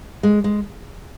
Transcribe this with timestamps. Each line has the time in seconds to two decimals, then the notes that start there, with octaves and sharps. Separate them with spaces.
0.23 G#3
0.44 G#3